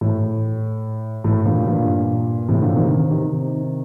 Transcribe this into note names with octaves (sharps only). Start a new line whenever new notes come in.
A2
A2
G2 A#2
G2 A#2
A2 C3
A#2 D3
C3 D#3
C3 D#3